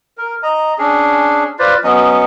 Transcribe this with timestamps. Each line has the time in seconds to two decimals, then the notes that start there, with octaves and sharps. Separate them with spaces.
0.18 A#4
0.43 D#5 A#5
0.78 C#4 D4 G#4
1.59 F4 B4 C5 D5
1.84 F#3 B3 C#4 D#5